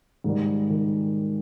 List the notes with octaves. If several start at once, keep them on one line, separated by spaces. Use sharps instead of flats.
G#2 D#3 G3
D#3